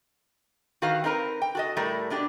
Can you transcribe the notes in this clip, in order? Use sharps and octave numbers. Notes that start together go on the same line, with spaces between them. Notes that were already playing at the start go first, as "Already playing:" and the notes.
D#3 F#4 A4 B4 F5
C4 D#4 A#4 B4
G5
F#4 A4 D#5
A2 G3 A3 A#4
B2 D4 F#4 G4